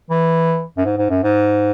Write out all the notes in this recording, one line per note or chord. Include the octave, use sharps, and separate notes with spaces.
E3
F#2
G#2
G#2
F#2
G#2